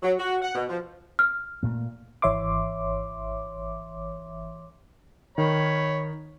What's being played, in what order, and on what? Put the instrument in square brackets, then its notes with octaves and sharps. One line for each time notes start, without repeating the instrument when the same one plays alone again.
[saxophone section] F#3
F#4
F#5
B2
F3
[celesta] F6
[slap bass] A#2 A3
[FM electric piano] G#1 E3 C#5 E5 C6 D6
[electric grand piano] D#3 [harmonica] C#5 B5